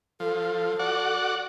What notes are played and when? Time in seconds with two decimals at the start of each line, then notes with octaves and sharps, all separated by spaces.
0.20 F3 A4
0.79 F#4 D5 F#5